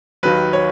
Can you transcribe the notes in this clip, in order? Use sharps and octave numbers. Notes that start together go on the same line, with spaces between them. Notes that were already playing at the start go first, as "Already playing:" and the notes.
D#2 D#3 F#3 B4
C#5